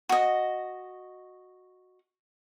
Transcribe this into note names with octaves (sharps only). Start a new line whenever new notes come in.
F#4 D#5